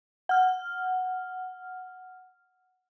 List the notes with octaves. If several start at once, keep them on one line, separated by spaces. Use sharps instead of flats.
F#5 F6